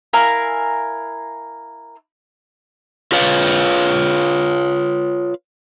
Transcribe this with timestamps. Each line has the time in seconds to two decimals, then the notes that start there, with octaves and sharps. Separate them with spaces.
0.13 E4 A#4 F5 G#5
3.12 F4 B4 C#5 F5